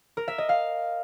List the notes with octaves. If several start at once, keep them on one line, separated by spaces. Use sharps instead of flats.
A#4
E5
D#5
F5